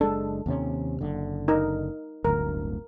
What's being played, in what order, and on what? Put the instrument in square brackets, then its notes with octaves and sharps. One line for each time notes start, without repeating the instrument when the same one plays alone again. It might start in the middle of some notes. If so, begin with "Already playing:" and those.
[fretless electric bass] F#1 G#3 D4 [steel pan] A4
[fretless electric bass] D#2 C3 C#4
F#1 D3
[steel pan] D#4 A#4
[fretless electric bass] D1 G1 D2 [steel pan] A#4